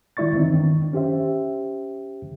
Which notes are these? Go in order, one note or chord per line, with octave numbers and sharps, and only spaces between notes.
D#3 G#3 E4 D5 C#6 A6
D#3 E3 B3 C4 D#4
D#3 D4
C#4 G4 C5 E5